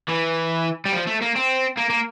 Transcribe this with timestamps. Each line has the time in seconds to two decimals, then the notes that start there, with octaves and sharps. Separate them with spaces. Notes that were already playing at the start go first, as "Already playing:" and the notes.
0.09 E3
0.86 G3
0.93 F3
1.07 A3
1.22 A#3
1.36 C4
1.78 A#3
1.90 A#3